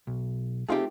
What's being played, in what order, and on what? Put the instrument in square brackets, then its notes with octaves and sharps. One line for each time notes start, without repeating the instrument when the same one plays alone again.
[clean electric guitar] B1
[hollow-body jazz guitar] A3 C4 G4 [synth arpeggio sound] D#4 F4 G#4